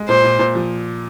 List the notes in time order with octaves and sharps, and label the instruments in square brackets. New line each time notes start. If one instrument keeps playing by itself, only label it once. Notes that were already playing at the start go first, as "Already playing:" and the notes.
Already playing: [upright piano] G#3
[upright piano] A#2 [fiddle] C5
[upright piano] A#2
A#2
F3